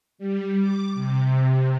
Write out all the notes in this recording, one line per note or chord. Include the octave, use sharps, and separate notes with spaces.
G3
D6
C3